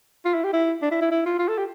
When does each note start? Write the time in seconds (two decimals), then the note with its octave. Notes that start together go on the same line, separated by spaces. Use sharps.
0.25 F4
0.34 E4
0.44 G4
0.53 E4
0.82 D4
0.91 E4
1.01 E4
1.11 E4
1.25 F4
1.39 F4
1.48 A4
1.58 G4